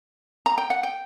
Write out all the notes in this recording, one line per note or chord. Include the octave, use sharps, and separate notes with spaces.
A#5
G5
F#5
G5